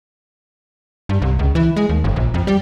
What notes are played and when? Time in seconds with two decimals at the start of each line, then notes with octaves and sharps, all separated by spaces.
1.09 G2
1.22 C2
1.39 C#2
1.55 E3
1.76 G#3
1.89 D#2
2.04 G1
2.16 A#1
2.34 F2
2.47 G3